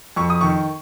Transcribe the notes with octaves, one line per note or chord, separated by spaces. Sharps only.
F2 C#6
D#6
D#3 C#6